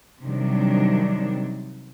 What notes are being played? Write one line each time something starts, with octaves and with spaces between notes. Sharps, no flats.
C3 D#3 F#3 G3 D4